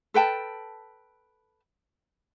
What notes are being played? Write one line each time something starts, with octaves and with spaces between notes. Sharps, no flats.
A4 B4 G5 A5